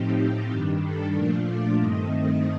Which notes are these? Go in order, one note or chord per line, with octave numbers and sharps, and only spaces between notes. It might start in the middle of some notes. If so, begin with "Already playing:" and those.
Already playing: A2 F3 C4 D#4 G4
G2 D#3 G3 D4 G4
A4
A#2 F3 A3 D4 F4 A#4
D5
G2 D#3 A3 C4 D#5